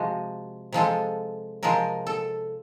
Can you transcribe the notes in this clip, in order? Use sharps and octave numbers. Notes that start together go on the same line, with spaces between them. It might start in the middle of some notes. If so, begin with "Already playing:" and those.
Already playing: C3 F3 G#3 F#4
C3 F3 G#3 A4
C3 F3 G#3 A#4
A4